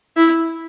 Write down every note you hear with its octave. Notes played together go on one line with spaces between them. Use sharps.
E4